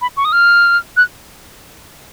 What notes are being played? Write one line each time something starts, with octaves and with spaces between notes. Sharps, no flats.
B5
C#6
D#6
F6
F#6